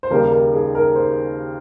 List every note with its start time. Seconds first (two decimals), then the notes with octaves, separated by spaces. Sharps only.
0.03 C5
0.10 D#2 C#3 G3 A#4
0.31 A#4
0.54 G#4
0.75 A#4
0.95 C5